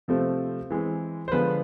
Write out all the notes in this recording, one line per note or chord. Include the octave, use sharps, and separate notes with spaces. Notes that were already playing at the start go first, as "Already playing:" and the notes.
C3 F3 A3 C4
E3 G#3 C4
C5
D3 F3 G#3 B3 B4